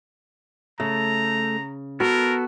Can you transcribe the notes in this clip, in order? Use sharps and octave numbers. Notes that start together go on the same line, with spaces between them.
C#3 A3 A#5
B3 F#4 A4 A#4